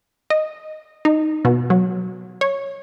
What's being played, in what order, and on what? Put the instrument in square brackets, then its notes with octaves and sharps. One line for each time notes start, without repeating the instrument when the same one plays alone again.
[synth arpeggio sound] D#5
D#4
B2
F#3
C#5